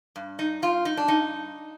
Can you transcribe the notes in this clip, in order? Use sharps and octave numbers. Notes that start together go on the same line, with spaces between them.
G2
D#4
G2 F4
D#4
D4
G2 D#4